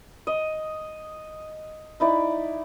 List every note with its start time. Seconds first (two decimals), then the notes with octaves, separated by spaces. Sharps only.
0.27 D#5
2.00 D#4 E4 D5